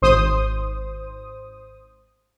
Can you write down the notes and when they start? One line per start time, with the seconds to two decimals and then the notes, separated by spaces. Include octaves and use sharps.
0.02 G#1 C5 D#6